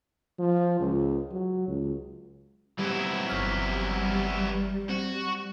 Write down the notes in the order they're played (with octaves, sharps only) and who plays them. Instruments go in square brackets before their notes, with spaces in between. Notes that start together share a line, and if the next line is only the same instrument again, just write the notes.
[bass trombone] F3
C#2
F#3
C#2
[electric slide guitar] E3 B3 C4 [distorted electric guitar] F#3 E4 [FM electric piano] G3
[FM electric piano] G1 F6 [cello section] G3
[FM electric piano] C4 [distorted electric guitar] F#4